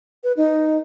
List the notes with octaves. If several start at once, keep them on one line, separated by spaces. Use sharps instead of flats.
B4
D#4